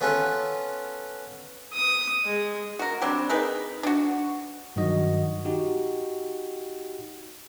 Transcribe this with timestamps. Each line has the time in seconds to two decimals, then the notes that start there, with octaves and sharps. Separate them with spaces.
0.01 B3 C#4 F4 A4 B4
1.73 D#6
2.25 G#3
2.79 F#4 A#4
3.02 F#3 G3 C4 D4
3.30 D#4 G#4 A#4 B4
3.83 D4 F#4
4.76 G2 D#3 F#3 F#4 D#5
5.45 D#4 F#4 G4